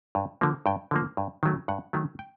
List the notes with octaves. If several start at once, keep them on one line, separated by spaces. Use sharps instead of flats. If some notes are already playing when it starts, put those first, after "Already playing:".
G2
D3 F3 A#3
G2 G5
D3 F3 A#3
G2
D#3 F#3 A3
G2 F#5
D#3 F#3 A3
G5